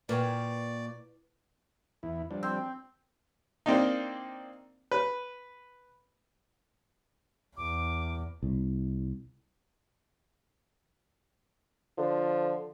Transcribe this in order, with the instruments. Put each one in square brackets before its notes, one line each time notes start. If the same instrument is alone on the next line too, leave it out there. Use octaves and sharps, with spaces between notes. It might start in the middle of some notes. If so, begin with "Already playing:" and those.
[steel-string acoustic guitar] A#2 [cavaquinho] A#4 C#5 G5 [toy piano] B4 F#5 [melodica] D5
[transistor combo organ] E2 E4
F3 G3 D4
[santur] C4
[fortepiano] A#3 C4 D4 D#4
B4
[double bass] E2 [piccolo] D6
[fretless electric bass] C2
[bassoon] D3 [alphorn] F3